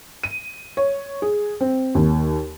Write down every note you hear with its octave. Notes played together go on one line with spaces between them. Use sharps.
D#7
C#5
G#4
C4
D#2